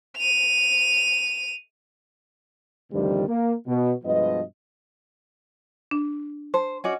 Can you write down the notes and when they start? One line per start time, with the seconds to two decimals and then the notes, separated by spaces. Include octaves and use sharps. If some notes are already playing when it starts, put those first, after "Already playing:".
0.17 D#7 F7
2.92 D2 G2 C3 D#3 F3 G3
3.28 A#3
3.67 B2
4.04 G2 B2 F3 G#3 B3 D#5
5.91 D4
6.54 C5 A5
6.84 C#4 F#4 D5 D#5